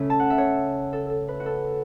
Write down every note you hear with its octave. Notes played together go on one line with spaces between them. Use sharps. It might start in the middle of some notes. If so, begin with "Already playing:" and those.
Already playing: C#3 A3 C#4
A5
F#5
E5
C#5
A4
A4
B4
F#4
A4